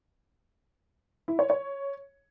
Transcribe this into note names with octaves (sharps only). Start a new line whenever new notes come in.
E4
C#5
C#5